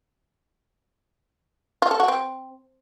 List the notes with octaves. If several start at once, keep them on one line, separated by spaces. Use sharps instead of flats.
F4
A4
F#4
C4